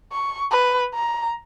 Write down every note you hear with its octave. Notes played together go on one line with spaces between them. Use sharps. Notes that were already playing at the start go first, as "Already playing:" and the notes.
C#6
B4
A#5